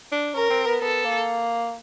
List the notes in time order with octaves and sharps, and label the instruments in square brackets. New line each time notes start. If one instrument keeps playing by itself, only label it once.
[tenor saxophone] D4
[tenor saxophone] C#4 [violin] A#4
[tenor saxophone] C4
B3
[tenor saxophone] B3 [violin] A4
[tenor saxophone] A#3